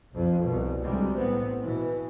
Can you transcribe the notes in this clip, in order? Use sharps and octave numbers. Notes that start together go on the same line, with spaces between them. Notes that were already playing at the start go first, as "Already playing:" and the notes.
B1 F2
C2 B2
D2 C3 G3 G#3
A1 B3 C4
B2 E3